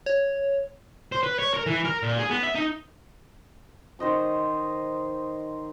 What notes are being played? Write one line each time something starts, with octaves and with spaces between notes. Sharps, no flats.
C#5
C5
B4
C#5
A#4
E3
A#4
A#2
G#4
B3
E5
D#4
D#3 C5 D#5 C#6